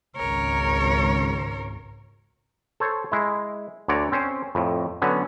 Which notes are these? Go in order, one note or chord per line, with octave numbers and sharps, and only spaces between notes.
G#1 C#2 A#4 C#5
A4 C5 C#5
G#3 E4
D2 D3 C#5 D5 A#5
C4 C#4 C5
F2 A2
D3 F#3 B3 C#4